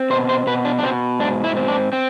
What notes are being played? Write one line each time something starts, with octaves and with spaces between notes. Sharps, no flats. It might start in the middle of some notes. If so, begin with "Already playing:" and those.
Already playing: C4
B2 C5
C5
B2 B4
D4
D4
B2 C4
G#2 D4
E4
C4
D4
C4